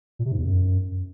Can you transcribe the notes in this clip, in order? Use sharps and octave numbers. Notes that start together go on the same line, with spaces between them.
A#2
C3
G#2
E2
F#2